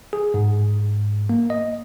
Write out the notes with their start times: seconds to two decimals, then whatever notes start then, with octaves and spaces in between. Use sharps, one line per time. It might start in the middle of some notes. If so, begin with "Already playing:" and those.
0.13 G#4
0.34 G#2
1.29 A#3
1.50 D#5